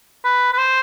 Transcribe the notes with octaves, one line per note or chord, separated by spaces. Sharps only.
B4
B4
C5